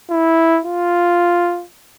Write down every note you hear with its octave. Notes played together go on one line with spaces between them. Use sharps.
E4
F4